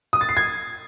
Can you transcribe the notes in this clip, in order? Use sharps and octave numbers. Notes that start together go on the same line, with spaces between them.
D#6
A6
C7
G#6